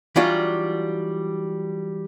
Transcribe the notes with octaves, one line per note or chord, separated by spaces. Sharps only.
E3 F#3 G3 D4 F4 F#4